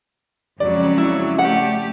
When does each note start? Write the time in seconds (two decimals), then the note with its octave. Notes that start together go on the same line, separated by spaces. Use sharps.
0.60 F2 C#3 F#3 G#3 D5
0.98 E4
1.38 A3 G4 F#5